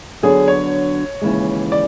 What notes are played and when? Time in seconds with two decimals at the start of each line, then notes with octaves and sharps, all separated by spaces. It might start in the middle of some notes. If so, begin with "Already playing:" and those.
0.23 D3 F#3 B3 D4 F#4 G#4
0.48 C#5
1.21 D#2 C#3 E3 G#3
1.72 D5